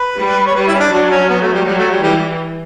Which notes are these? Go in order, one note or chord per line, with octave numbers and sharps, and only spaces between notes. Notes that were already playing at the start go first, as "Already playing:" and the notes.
Already playing: B4
G3
C#5
G3 B4
E4
C#4
D4
F#3 D4
C#4
B3
A3
G3
F#3 G3
A3
G3
E3 G3